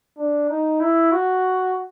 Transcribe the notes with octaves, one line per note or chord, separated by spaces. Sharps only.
D4
D#4
E4
F#4